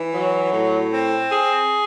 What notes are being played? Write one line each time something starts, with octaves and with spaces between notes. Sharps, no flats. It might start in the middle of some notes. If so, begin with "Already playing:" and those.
Already playing: E3
F#3
A2
C4
G#4